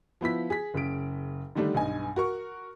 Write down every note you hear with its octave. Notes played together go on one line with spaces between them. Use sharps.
F3 B3 E4 B6
G#4 B6
F#1 C#3 D7
D3 D#3 G3 A3 D4 D#4
B1 G2 D#5 G#5
F#4 A#4 C#6